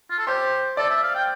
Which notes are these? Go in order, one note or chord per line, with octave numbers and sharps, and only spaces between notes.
F4
A4
G4 C5
A4 D5
E5
F5
G5